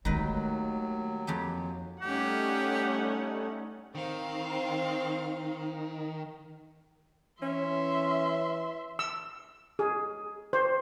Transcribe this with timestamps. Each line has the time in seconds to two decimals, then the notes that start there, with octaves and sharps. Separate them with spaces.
0.05 D#2 D#3 F#3 G#3 A3 B4
1.27 F2 G4 G#4
2.02 G3 A3 C#4 D#4 G4 F#5
3.95 D#3 C4 F5
7.42 E3 C#4 E5 C6
8.99 E6
9.79 G#4
10.53 C5